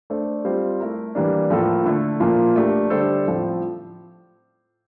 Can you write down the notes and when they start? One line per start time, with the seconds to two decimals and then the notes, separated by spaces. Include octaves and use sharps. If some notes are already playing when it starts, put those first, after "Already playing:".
0.10 A3 D4 A4 C5
0.45 G3 C4 F4 C5
0.80 A3 E4 A#4
1.15 E3 G3 A#3 D4
1.50 A2 F3 A#3 F4 A4
1.86 D3 A3 E4
2.20 A#2 F3 A#3 F4
2.56 A3 D4 G4 A#4
2.90 D3 G3 D4 A4 C5
3.26 A2 F3 C4